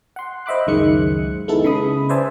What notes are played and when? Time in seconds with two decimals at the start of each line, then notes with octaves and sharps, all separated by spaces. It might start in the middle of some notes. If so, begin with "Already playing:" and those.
0.16 F#5 C6
0.46 C5 D#5 E5 B5 D6 F#6
0.67 C#2 F#2 D#3 G#3 F#6 C#7
1.48 G#3 B3 D#4 E4 A4
1.64 C#3 B5 D#6
2.09 B4 C5 D5 E5 G#5 A5